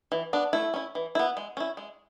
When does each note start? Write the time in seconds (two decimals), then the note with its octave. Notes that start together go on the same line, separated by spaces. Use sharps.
0.12 E3
0.33 B3 D4
0.53 A3 E4
0.74 C#4 E4
0.95 E3
1.15 B3 E4
1.37 G#3
1.57 C#4 E4
1.77 G#3